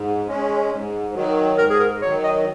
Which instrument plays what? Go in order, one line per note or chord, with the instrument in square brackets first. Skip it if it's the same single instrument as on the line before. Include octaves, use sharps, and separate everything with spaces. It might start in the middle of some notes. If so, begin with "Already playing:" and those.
Already playing: [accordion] G#2
G#3 C#4
G#2
D#3 F#3
[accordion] G#2 [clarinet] A#4
[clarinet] G#4
A#4
[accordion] D#3 F#3 [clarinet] C#5
[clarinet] D#5